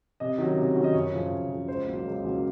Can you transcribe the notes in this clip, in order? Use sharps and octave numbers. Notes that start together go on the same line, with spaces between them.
C3 D#5
D#3 F#3 C#4
C3
D#3 F#3 C#4
D#5
F#2 C#5
C#3 F3
F#2
C#3 F3
C#2 C5
C#3 F#3 A#3
C#2
C#3 F#3 A#3